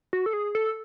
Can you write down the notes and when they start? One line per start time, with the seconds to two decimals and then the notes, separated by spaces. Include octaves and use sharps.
0.13 F#4
0.26 A4
0.33 G#4
0.55 A4